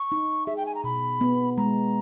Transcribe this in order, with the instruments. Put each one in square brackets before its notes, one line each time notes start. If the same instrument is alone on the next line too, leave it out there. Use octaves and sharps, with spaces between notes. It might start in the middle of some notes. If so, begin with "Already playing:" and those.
Already playing: [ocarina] C#6
[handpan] D#4
[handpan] G#4 [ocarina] E5
[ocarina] G5
G#5
A#5
[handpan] B2 [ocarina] B5
[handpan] B3
[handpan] G#3 [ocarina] A#5